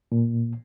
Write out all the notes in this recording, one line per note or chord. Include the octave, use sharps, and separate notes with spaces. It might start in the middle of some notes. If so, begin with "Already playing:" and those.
A#2